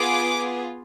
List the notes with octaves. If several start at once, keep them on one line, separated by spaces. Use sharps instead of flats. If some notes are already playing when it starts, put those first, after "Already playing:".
Already playing: B3 F4 G#4 D6